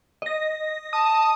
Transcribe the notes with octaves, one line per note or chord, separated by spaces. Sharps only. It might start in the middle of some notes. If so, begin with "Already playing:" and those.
D#5 A#6
A5 D#6